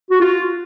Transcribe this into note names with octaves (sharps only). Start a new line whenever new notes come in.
F#4
F4